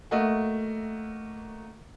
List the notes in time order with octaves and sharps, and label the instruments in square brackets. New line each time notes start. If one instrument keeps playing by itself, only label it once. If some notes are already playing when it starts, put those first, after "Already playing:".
[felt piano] A3 A#3 F#4 D#5 E5 F#5